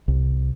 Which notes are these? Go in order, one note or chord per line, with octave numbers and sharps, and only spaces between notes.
C2